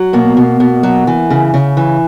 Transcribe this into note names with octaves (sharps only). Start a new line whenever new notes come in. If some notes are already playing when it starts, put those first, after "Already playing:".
Already playing: F#3
B2 A#3
B2
B2
F#3
E3
C#3
C#3
E3